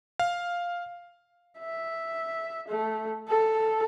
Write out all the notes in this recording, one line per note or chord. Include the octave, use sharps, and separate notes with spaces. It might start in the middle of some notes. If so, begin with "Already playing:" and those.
F5
E5
A3
A4